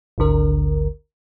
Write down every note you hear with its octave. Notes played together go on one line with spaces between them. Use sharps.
G#1 D2 D3 A#4